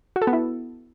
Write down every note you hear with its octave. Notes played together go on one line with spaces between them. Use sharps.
F#4
A4
B3
E4